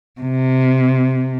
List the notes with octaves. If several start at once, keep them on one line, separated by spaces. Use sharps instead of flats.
C3